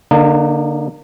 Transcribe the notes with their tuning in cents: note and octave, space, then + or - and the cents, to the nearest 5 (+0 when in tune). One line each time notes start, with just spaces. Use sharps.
D3 -15 A#3 +0 D#4 -40